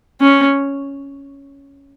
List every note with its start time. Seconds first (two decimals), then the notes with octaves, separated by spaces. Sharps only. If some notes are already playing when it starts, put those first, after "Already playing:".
0.21 C#4